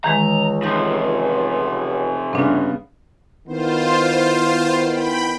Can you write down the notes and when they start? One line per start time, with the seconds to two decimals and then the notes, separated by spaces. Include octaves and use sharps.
0.04 C#2 D#3 E3 G#3 A#5
0.63 C3 F3 D#4 G6
2.33 G2 C#3 B3 C4 D4 G#5
3.47 D#3 B3 E4 F4 C5
4.84 G5 B5